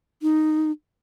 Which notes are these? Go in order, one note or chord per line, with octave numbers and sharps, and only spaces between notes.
D#4